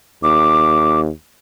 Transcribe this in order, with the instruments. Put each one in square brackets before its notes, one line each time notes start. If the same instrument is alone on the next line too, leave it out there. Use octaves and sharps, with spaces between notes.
[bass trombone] D#2 [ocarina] D6